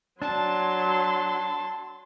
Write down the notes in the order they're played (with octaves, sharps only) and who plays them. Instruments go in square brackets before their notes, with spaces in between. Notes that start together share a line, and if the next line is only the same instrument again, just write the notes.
[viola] F#3 C6 [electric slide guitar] D4 [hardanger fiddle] A5